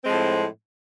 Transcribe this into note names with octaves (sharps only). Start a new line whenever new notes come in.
A2 F3 G#3 C4